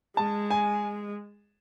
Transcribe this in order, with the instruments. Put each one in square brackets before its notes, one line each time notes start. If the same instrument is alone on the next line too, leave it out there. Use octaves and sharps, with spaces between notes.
[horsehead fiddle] G#3 [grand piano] A5
[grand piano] G#5